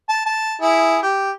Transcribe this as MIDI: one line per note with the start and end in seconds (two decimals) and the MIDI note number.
0.09 0.21 81
0.26 0.56 81
0.61 0.98 64
0.61 0.98 68
1.02 1.31 67